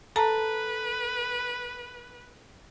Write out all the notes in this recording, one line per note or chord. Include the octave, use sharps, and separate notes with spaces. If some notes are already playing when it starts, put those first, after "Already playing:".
A4 B4 A5 A#5